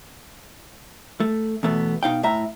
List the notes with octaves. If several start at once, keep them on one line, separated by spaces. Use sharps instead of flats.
A3
E2 B2 A3 B3
B2 D#4 F5 G5
A2 E5 A#5